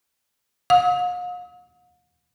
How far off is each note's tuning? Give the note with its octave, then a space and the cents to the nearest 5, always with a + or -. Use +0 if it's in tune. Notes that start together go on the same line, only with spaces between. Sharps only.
F5 +45 D#6 +45